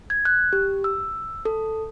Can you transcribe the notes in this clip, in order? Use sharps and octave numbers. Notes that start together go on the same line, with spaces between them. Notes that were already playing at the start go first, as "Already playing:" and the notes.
G#6
F#6
G4
E6
A4